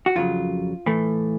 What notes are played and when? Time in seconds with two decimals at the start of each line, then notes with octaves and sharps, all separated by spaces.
0.06 F#4
0.15 F2 C#3 F#3 F4
0.86 A2 E3 A3